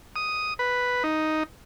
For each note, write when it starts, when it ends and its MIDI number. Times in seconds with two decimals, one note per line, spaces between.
0.16 0.54 87
0.59 1.03 71
1.04 1.43 63